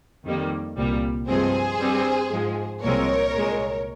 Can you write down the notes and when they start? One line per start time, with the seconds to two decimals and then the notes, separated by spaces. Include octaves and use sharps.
0.25 F2 D#3 G3 A#3
0.76 C2 A#2 G3 A#3
1.27 G2 F3 G#3 C4 G#4 C5
1.79 G2 G3 C4
2.30 G#2 F3 G#3
2.82 C2 A#2 F3 G#3 C4 A#4 C#5
3.34 C2 A#2 G#3